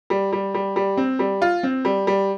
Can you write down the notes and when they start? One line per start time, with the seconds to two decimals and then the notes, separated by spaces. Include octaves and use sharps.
0.10 G3
0.33 G3
0.54 G3
0.76 G3
0.97 C4
1.19 G3
1.42 F4
1.63 C4
1.85 G3
2.07 G3